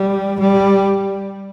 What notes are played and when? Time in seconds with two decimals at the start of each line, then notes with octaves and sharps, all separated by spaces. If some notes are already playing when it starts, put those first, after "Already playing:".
Already playing: G3
0.39 G3